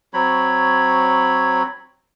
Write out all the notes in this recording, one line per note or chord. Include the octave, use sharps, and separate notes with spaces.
F#3 C4 C#5 B5